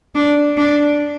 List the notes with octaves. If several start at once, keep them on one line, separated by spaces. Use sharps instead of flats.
D4
D4